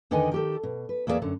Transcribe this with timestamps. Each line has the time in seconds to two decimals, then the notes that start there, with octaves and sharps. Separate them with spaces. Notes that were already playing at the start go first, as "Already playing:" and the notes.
0.11 E2 D3 D#3 B4 D#5 G#5
0.31 D#3 G4 A4
0.63 B2
0.89 B4
1.07 E2 A#3 E4 G#4 D5 E5
1.22 F#2 D3